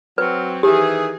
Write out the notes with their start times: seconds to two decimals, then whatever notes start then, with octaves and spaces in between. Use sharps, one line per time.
0.18 F#3 C4 B4
0.63 D#3 E3 G4 G#4